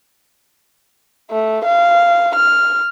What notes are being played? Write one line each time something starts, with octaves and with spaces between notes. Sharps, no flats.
A3
F5
F6